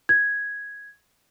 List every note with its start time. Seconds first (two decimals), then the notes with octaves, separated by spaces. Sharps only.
0.09 G#6